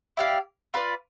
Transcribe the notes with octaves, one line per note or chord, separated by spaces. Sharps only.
E4 G4 D5 F5
F4 B4 D5